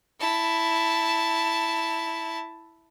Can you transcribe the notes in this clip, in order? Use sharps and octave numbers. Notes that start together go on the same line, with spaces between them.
E4 A5